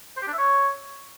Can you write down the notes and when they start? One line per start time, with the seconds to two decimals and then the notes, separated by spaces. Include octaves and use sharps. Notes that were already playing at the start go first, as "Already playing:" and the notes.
0.17 C5
0.22 G4
0.28 D4
0.33 E5
0.38 C#5